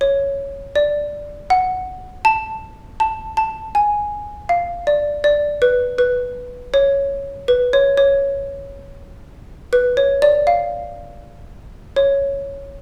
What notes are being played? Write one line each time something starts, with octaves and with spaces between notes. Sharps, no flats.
C#5
D5
F#5
A5
A5
A5
G#5
F5
D5
D5
B4
B4
C#5
B4
C#5
C#5
B4
C#5
D5
F5
C#5